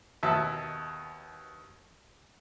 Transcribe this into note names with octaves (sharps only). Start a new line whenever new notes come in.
D#2 B2 E5 A5